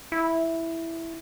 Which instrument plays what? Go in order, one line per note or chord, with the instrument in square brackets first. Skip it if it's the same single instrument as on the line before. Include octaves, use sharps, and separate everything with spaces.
[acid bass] E4